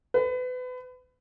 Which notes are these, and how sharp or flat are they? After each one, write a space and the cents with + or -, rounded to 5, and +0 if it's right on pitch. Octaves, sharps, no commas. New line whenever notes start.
B4 +30